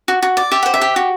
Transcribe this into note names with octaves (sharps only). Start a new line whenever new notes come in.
F#4
F#4
D5
G4 E5
C5 F#5
E5
G4
F#4